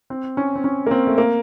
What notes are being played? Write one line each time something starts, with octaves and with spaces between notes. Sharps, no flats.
C4
C#4
C4
C#4
A#3
C4
A3
A#3